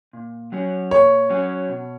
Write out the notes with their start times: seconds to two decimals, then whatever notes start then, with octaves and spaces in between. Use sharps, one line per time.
0.13 A#2
0.52 F#3 C#4 F#4
0.91 A#2 C#5
1.30 F#3 C#4 F#4
1.69 B2